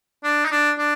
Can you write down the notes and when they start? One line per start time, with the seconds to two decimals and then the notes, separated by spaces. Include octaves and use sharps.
0.24 D4
0.45 D#4
0.51 D4
0.78 D4